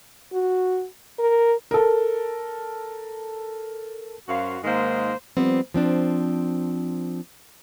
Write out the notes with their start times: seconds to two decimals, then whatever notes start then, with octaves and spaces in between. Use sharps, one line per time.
0.33 F#4
1.19 A#4
1.71 A4 A#4
4.28 F#2 F#4 C5 F5
4.64 G#2 D#3 G#3 A#3 C5
5.37 F3 G3 B3 C4
5.74 F3 C4 D4